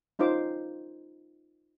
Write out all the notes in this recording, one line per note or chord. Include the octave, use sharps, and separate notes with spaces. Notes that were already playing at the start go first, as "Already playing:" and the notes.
C#4 D#4 F4 C5 D6